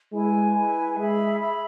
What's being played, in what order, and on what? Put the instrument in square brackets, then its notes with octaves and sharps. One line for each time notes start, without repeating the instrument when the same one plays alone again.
[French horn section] G#3 [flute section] E4 B4 G#5
[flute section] E4 B4 G#5
[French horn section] G#3 [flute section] G#4 E5 B5
[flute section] G#4 E5 B5